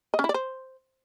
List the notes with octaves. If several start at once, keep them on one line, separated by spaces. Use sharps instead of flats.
D#5
C#4
E4
D5
C5